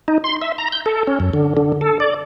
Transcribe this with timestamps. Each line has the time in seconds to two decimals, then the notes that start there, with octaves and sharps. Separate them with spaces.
0.08 D#4
0.24 C6
0.42 E5
0.58 A#5
0.72 G6
0.86 A4
1.07 C#4
1.20 F#2
1.33 D3
1.57 D3
1.81 A4
2.00 D5